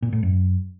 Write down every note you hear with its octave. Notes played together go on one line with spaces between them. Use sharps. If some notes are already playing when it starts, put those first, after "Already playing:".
A#2
A2
F#2